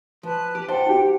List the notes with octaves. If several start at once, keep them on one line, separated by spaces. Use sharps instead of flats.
F3 B4 A5
G4
C5 F#5 G5 A5
F#4 G4